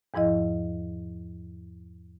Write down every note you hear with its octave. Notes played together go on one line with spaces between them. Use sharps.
E2 G#2 F3 E4 D#5